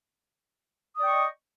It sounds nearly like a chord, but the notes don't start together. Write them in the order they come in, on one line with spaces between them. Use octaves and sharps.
D#6 D5 G5 C#6 D#5